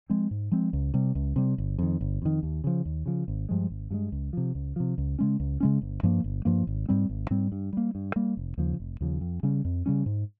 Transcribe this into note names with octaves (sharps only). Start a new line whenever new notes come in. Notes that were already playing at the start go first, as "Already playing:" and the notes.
F3 G#3 C4
G#2
F3 G#3 C4
C#2
C3 G3
C#2
C3 G3
G1
F2 D#3
G1
F2 D#3
D#2
C#3 F3
D#2
C#3 F3
G#1
G2 F3 G#3
G#1
G2 F3 G#3
C#2
C3 F3
C#2
C3 F3
C#2
C#3 G#3 C#4
C#2
C#3 G#3 C#4
G1
G2 F3 A#3
G1
G2 F3 A#3
G#1
G#2 G3 C4
G#1
G#2 G3 C4
G2
G3 A#3
G2
G3 A#3
F1
D#2 C#3 F3
F1
D#2 C#3 F3
F2
C#3 G3 C#4
F2
C#3 G3 C#4
G#2